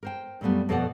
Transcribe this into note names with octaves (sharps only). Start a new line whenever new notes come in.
A#4 C5 G5
F#2 A#2 G3 A3 B3
F2 B2 A4 C#5 D5 F#5